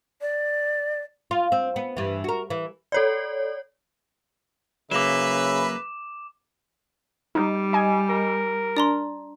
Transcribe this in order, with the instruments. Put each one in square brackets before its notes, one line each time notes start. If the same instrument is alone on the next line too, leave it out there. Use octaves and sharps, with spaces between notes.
[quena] D5
[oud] F4
C4
B3
G2 E3
F#4 A#4
E3
[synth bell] A4 C#5 D5
[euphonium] C#3 [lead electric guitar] F#3 A#3 [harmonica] B4 E5 B5 [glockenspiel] D6 E7
[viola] G3 [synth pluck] D#4
[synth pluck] D#5 G#5
[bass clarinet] A#4
[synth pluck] D4 [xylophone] D5 A#5 C6